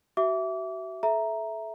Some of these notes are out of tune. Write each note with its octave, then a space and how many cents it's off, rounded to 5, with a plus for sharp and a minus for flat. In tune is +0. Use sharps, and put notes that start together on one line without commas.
F#4 +35 E5 +0 D6 -30
A4 -35 E5 +0 A#5 +0